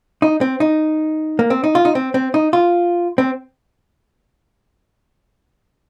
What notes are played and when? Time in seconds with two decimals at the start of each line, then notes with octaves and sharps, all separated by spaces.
0.22 D#4
0.41 C4
0.60 D#4
1.39 A#3
1.50 C4
1.64 D#4
1.75 F4
1.85 D#4
1.95 C4
2.14 C4
2.34 D#4
2.53 F4
3.18 C4